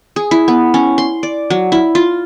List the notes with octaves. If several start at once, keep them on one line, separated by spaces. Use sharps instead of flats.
G#4
E4
B3
C#4
C6
D5
F#3
E4
F4